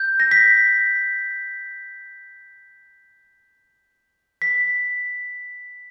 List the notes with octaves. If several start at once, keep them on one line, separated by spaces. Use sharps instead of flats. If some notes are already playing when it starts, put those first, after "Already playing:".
Already playing: G6
A#6
B6
B6